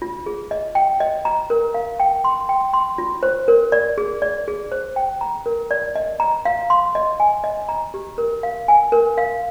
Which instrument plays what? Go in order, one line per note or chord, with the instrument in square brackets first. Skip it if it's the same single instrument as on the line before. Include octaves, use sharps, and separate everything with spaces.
[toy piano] F4
G#4
D#5
G5
D#5
A#5
A#4
F5
G5
C6
G5
C6
F4
C5
A#4
D5
G#4
D5
G#4
C5
G5
A#5
A#4
D5
D#5
A#5
F5
C6
D#5
G#5
D#5
A#5
G4
A#4
F5
G#5
A#4
F5